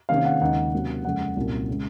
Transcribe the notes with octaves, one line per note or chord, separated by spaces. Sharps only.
C3 D#3 A#3 C#4 F5
F#5
D#2 C#3 G#3 D#4 F#5
C3 F#3 A#3 C#4
F2 C#3 G#3 F#5
C2 A#2 F#3 C#4
C#3 G#3